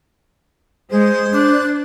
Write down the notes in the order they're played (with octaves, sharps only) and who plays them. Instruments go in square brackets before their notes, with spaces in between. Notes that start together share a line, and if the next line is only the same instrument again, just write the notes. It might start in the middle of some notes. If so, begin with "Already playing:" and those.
[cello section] G#3 [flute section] G#4 [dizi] C5
[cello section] D4 [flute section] D6 F#6